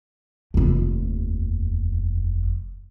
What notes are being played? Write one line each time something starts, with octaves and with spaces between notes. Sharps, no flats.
F1 D#2